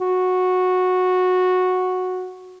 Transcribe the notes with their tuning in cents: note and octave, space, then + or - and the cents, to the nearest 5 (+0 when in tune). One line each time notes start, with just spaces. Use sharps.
F#4 -10